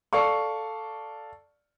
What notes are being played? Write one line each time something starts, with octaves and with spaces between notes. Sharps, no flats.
A4 D5 F5 C#6